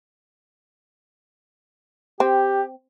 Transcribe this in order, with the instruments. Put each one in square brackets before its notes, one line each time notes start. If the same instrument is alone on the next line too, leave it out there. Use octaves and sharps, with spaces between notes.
[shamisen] C4 [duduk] G4